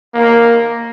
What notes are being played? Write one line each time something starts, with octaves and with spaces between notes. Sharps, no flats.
A#3